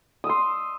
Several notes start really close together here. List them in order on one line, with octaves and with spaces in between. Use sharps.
D#6 E6 C6